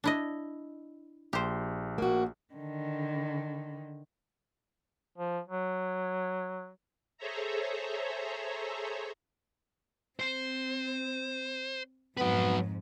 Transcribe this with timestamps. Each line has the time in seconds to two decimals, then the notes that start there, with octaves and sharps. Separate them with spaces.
0.04 D4 E4 D#5
1.33 A#1 G4 C5
1.98 A#3 F#4
2.54 D3 D#3
5.18 F3
5.48 F#3
7.18 G#4 A4 C5 C#5 E5 A#5
10.20 C4 C5
12.17 F2 G#2 F#3 B3 B4